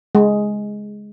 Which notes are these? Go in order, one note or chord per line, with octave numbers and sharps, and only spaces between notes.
G#3